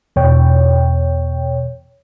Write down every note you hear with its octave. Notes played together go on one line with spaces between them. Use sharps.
E2 B2 C#5 G5